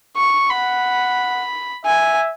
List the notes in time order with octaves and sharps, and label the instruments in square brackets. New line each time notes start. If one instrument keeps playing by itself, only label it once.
[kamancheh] C#6
[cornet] F#5 [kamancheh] B5
[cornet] E5 [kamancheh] G#5